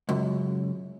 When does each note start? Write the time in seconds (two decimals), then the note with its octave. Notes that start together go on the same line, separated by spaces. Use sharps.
0.09 C#2 F#2